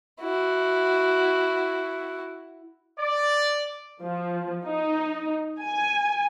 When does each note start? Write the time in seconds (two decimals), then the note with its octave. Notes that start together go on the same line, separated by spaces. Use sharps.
0.21 E4 F#4
2.99 D5
4.02 F3
4.64 D#4
5.60 G#5